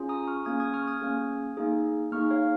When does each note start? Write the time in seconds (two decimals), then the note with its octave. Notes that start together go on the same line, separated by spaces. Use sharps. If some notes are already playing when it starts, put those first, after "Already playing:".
Already playing: C#4 F4 G#4
0.09 A#5 D#6
0.27 C#6 F6
0.45 A#3 C#4 G#4 D#6 G#6
0.60 D#6 G#6
0.74 C#6 F6
0.87 D#6 G#6
1.01 A#3 C#4 G#4
1.57 A#3 D#4 G#4
2.12 A#3 D#4 G#4 C#6 F6
2.30 C#5 F5